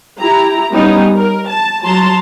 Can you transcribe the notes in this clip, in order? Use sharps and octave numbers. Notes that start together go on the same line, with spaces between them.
E4 G4 A#5
G3 B3 C#4 D#4
A#4
A5
F#3 A5 A#5 C6